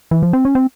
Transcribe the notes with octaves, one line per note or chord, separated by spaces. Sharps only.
E3
F3
C4
C#4
C4